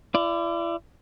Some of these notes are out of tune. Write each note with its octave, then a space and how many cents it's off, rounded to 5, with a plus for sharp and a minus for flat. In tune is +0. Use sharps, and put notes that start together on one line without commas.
E4 +40 D5 +0